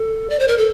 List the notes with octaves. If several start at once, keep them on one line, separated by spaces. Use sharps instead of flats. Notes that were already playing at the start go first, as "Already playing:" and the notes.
Already playing: A4
D5
C5
A#4
A4